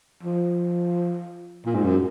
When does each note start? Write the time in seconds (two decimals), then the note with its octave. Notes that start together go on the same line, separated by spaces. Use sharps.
0.23 F3
1.66 A#2
1.75 G#2
1.83 F#2